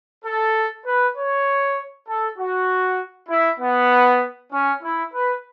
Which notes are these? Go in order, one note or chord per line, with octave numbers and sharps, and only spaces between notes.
A4
B4
C#5
A4
F#4
E4
B3
C#4
E4
B4